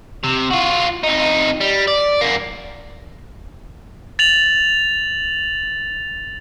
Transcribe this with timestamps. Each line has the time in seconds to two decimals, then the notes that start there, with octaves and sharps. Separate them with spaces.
0.24 C3
0.51 F4 F#4
1.03 F2 D#4
1.60 G3
1.88 D5
2.21 F#2 A#3
4.19 A6 F7 F#7